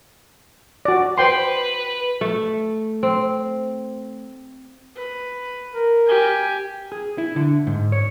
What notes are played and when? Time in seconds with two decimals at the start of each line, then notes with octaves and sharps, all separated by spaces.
0.85 F#4 D5
1.18 B4 C5 G5 C6
2.21 A3
3.03 C4
4.96 B4
5.73 A#4
6.07 G4 G#5
6.92 G#4
7.18 E4
7.36 D3
7.67 G#2
7.92 C#5